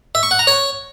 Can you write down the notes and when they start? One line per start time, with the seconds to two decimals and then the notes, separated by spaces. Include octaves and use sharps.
0.15 E5
0.23 C#6
0.31 F#5
0.39 A#5
0.47 C#5